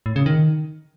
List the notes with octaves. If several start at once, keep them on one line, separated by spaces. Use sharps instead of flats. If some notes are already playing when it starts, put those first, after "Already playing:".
A2
C#3
D#3